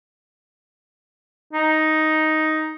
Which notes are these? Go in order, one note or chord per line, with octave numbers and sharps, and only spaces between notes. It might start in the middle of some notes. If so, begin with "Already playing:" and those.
D#4